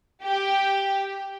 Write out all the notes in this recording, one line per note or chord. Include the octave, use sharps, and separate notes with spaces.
G4